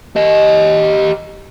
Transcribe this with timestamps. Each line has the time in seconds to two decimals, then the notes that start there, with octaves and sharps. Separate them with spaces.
0.16 G4 D#5